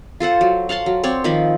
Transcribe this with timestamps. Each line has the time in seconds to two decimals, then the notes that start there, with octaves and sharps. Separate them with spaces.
0.20 F4 A4 C5 F#5
0.41 F#3
0.69 F5 F#5 A5 C6
0.86 F#3
1.04 C4 C#5 D5
1.24 D#3 F3 C4 B5